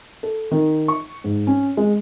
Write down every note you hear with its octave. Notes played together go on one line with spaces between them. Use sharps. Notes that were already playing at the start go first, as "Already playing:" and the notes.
A4
D#3
C#6
G#2
C#4
G#3